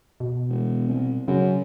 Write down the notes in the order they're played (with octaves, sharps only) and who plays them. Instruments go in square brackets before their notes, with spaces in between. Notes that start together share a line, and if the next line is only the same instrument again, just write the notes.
[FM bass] B2
[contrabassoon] E1
C2
[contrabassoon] F#2 [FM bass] C#3